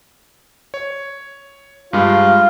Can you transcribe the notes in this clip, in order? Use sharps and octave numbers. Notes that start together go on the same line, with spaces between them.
C#5
G2 G#3 F4 G4